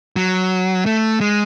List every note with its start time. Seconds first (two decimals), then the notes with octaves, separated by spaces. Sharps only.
0.16 F#3
0.86 A3
1.21 G#3